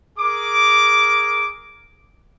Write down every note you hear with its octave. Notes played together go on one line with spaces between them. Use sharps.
G#4 A#4 D6